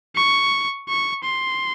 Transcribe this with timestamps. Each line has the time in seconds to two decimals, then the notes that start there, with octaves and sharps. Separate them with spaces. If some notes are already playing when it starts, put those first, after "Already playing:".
0.16 C#6
0.88 C#6
1.24 C6